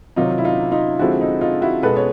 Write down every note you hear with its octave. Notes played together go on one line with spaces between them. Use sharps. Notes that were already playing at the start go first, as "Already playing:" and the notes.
C3 D#3 F#3 D#4 F4
E4
D#4 F4
D#4 F4
D3 F3 G#3 C4 E4 F#4
D#4
D#4 F4
E4 F#4
B2 G#3 B3 A4 B4
C#5